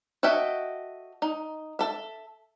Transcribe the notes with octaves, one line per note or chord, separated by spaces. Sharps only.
F#4 A4 D#5 E5 G5
D#4
A4 E5